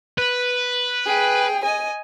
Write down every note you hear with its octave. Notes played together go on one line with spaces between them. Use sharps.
B4
G#4 G5
D#5 G#5